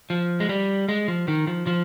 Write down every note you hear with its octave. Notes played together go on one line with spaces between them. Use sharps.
F3
G#3
G3
G#3
F3
D#3
F3
F3